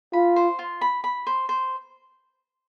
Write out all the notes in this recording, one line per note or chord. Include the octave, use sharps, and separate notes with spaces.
F4 B5
C5
F4
B5
B5
C5
C5